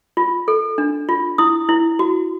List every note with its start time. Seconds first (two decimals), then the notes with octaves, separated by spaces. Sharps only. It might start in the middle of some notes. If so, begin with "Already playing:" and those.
0.17 F4
0.48 A4
0.78 D4
1.09 F4
1.38 E4 D#6
1.69 E4
1.99 F#4